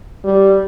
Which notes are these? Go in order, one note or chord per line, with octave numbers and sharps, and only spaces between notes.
G3